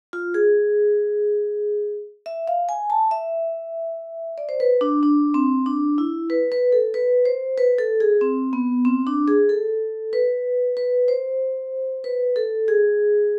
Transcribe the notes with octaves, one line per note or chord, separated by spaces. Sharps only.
F4
G#4
E5
F5
G#5
A5
E5
D5
C5
B4
D4
D4
C4
D4
E4
B4
B4
A4
B4
C5
B4
A4
G#4
C4
B3
C4
D4
G#4
A4
B4
B4
C5
B4
A4
G#4